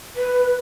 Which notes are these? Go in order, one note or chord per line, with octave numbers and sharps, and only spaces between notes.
B4